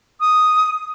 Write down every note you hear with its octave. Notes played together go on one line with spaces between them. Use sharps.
D#6